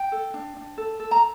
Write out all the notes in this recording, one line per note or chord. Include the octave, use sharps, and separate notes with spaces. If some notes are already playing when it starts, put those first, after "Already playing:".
Already playing: G5
A4
D4
D4
A4
A4
A#5